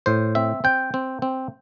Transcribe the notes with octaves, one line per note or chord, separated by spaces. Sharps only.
A2 C5
C4 E5
C4 G5
C4
C4